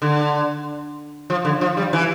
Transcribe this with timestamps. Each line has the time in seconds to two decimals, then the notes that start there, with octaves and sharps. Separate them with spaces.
0.02 D3
1.30 F3
1.45 D3
1.61 F3
1.77 G3
1.93 E3